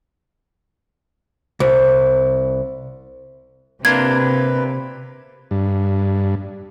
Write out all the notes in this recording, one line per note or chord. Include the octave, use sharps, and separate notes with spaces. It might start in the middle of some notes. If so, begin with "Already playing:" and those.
C2
C3 A#3 D4 F4 B4 G#6
G2